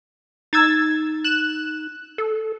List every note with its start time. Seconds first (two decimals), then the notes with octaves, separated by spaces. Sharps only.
0.53 D#4 E6 G#6 A6
1.24 F#6 E7
2.18 A4